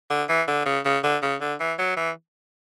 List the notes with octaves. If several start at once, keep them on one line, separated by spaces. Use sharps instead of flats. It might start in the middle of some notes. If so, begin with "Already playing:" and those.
D3
E3
D3
C#3
C#3
D3
C#3
D3
E3
F#3
E3